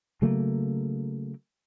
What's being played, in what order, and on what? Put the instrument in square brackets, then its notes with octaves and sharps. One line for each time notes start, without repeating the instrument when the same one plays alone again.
[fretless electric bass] C#3 F#3 A3 A#3